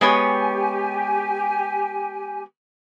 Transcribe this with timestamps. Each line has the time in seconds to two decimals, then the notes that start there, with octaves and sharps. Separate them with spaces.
0.01 G#3 B3 G4 C#5 G#5